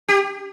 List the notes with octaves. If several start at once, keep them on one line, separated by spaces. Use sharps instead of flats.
G4